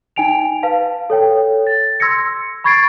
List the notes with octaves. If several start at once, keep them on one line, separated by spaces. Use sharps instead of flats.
D#4 G5 G#5 D7 F7
B4 F5 A5
A4 C#5 G5
A6
C6 E6 G#6 A#6 C#7
B5 C#6 G#6 A6 C7 D7